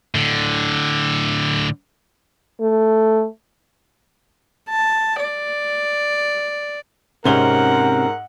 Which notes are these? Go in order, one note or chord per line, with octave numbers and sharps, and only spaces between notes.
A2 D3
A3
A5
D5
G#2 C3 C4 C#4 A#4 F#5 G7